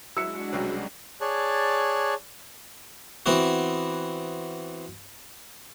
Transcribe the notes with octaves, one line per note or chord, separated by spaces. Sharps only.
F#3 G#3 D4 E4 F#4 E6 C#7
C2 B2 F#3 G3 C#4
G#4 C#5 D5 A5 F#6
E3 B3 C4 F#4